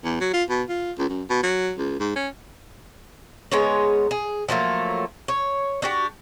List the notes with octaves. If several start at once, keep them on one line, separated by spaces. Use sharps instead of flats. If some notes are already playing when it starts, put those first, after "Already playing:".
E2
F#3
F4
B2
F4
C#2
F#2
B2
F#3
C#2
G#2
C#4
G#3 B3 D#4 C#5
G#4
F3 F#3 A3 A#3
C#5
D4 F#4 G4